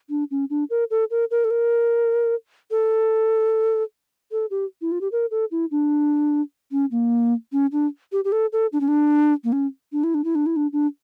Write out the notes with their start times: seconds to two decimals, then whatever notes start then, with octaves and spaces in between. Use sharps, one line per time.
0.10 D4
0.31 C#4
0.50 D4
0.70 A#4
0.90 A4
1.11 A#4
1.31 A#4
1.44 A4
1.51 A#4
2.71 A4
4.32 A4
4.51 G4
4.81 E4
4.92 F4
5.01 G4
5.12 A#4
5.31 A4
5.51 E4
5.71 D4
6.71 C#4
6.91 A#3
7.52 C#4
7.72 D4
8.12 G4
8.24 G4
8.32 A4
8.53 A4
8.73 D4
8.81 C#4
8.88 D4
9.44 A#3
9.52 C#4
9.92 D4
10.04 E4
10.14 D4
10.24 E4
10.35 D4
10.46 E4
10.56 D4
10.73 D4